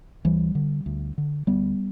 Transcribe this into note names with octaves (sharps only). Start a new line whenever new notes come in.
D2 E3 G3
D3
D2
D3
D2 G3 B3